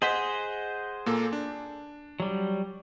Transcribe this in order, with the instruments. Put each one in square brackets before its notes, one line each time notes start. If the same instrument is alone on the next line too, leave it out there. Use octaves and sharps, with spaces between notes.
[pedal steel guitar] G#4 C5 [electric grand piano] D#5 F#5 B6
[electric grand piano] A#2 A#3 A4
D4
[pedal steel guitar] F#3 G3